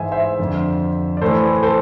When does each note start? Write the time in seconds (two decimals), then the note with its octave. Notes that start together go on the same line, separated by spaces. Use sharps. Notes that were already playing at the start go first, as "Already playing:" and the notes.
Already playing: G#2 E3 C5 E5 G#5
0.12 C5 E5
0.39 F2 D3
1.17 D5
1.22 A2 E3 A4 C5
1.63 A4 C5